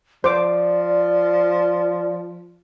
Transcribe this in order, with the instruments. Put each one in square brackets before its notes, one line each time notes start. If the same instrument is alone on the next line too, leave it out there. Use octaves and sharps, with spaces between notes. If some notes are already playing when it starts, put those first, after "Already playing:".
[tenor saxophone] F3 [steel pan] C5 D6 [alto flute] D5